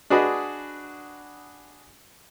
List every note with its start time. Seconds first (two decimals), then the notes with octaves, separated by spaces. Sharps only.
0.10 D4 F#4 G#4 B4 D#5